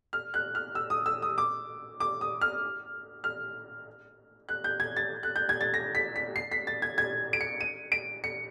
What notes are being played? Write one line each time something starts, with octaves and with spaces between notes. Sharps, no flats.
F6
F#6
F6
E6
D#6
E6
D#6
D6
D6
D#6
F6
F6
F#6
G6
G#6
A6
F#6
G6
G#6
A6
A#6
B6
B6
C7
B6
A6
G#6
G#6
D7
C#7
D#7
D7
C#7